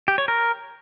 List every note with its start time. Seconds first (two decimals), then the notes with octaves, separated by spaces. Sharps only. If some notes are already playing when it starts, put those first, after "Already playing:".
0.08 G4
0.18 C#5
0.28 A#4